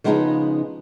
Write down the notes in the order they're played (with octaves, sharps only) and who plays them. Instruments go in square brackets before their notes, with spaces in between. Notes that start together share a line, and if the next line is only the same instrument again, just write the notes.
[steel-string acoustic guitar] C#3 F3 G#3 B3 C4 D#4